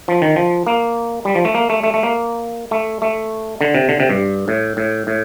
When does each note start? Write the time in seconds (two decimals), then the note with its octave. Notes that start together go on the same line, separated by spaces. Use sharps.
0.08 F3
0.22 D#3
0.36 F3
0.67 A#3
1.25 G3
1.35 F3
1.45 A3
1.55 A#3
1.70 A3
1.84 A3
1.94 A3
2.03 A#3
2.71 A3
3.02 A3
3.61 D3
3.75 C3
3.89 D3
4.00 C3
4.10 G2
4.48 A2
4.77 A2
5.07 A2